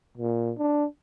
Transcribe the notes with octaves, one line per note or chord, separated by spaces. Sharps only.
A#2
D4